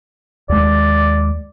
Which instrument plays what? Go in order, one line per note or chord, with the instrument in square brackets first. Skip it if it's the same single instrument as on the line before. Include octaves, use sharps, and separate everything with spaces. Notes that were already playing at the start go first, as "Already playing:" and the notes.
[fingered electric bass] D#2 G#3 [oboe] D5